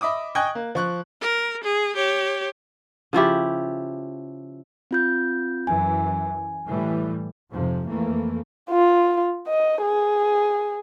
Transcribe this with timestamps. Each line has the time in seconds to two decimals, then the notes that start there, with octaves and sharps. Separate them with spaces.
0.01 D#5 E5 B5 D6 D#6
0.35 D#5 G5 G#5 C#6 F#6 G#6
0.55 A#3
0.75 F3 C#6 F#6
1.21 A#4
1.64 G#4
1.96 G4 C#5
3.13 C#3 F3 E4 G4
4.91 C4 F4 G6
5.67 F#2 E3 G#5
6.67 A2 E3 G3
7.50 F2 G#2 C3 F3
7.87 F2 E3 A3 A#3
8.70 F4
9.48 D#5
9.82 G#4